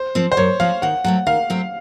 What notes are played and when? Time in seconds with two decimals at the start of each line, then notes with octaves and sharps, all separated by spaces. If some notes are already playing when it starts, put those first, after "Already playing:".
Already playing: C5
0.15 F3 C4
0.32 C5
0.37 F#2 C#5
0.60 F3 C4 F5
0.82 D#3 F#5
1.04 F#3 A3 C4 F#5
1.27 D#3 F5
1.50 F#3 A3 C4